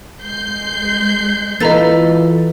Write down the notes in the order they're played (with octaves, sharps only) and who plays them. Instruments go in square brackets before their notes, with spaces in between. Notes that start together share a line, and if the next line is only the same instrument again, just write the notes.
[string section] G#3 G6 C7
[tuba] E3 [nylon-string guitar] F4 A4 B4 [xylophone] D#5 A#5 A6